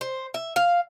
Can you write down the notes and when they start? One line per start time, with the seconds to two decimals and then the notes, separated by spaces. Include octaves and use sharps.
0.01 C5
0.34 E5
0.56 F5